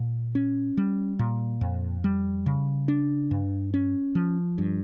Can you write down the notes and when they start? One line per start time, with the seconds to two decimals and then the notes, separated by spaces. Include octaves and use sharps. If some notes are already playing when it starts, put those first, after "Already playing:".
Already playing: A#2
0.35 C#4
0.77 G3
1.19 A#2
1.61 F2
2.04 G3
2.46 C#3
2.88 D4
3.31 G2
3.74 C#4
4.15 F3
4.58 G2